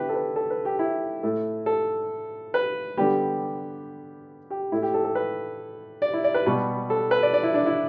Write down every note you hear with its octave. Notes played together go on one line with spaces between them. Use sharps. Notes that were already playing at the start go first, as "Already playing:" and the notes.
Already playing: D3 B3 E4 G4 B4
A4
B4
A4
B4
G4
E4
A2 A3
A4
B4
D3 G3 B3 G4
G4
A2 A3 E4
G4
A4
A4
B4
D5
E4
D5
B4
B2 G3 B3
A4
B4
D5
D5
E4
D4
E4